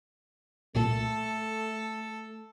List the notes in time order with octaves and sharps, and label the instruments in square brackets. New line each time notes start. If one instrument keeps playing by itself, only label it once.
[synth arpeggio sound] C2 A#2 [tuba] A3 [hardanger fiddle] A4